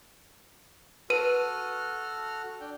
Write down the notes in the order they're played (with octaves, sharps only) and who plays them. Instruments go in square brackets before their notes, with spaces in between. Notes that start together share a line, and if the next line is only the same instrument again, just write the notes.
[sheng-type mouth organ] F#4 A4 F6 [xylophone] B4 D#7
[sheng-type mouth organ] D4 G5